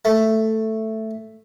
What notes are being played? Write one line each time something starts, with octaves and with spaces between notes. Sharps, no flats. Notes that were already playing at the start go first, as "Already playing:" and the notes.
A3